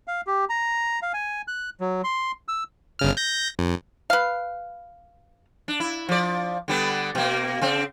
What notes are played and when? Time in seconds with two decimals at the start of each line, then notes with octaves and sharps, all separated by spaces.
0.08 F5
0.27 G4
0.49 A#5
1.02 F5
1.14 G#5
1.48 F#6
1.80 F#3
2.04 C6
2.48 E6
2.99 G1 C#3 F6
3.17 G6 A#6
3.59 F2
4.10 B4 F5
5.68 D4
5.80 E4
6.09 F3 D5
6.68 D3 G3 B3
7.15 B2 A#3
7.62 C#3 C4